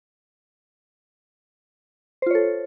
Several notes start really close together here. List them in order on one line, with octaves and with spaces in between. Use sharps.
C5 F4 C#5 A4